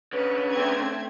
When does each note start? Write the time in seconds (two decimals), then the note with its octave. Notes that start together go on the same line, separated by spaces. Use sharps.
0.13 D3 C#4 B4
0.52 A3 C4 G#6